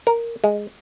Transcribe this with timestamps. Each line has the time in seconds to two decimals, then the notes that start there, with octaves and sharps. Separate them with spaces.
0.07 A#4
0.44 G#3